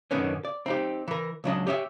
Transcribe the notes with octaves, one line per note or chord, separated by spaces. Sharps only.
F#2 B2 D3 D#3 B3 C#4
D5
C4 D#4 G4
E3 A#4
C#2 F#3 D4 D#5
G4 C#5 D#5 E5